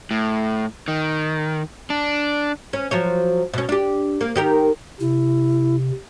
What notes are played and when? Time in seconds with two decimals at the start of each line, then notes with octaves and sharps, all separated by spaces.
0.11 A2
0.88 D#3
1.90 D4
2.73 C#4
2.91 F3 F#3 C#5
3.54 B2 C#4
3.69 D4 G4
4.21 A#3
4.35 D#3 G4 A#4
5.00 C3 E4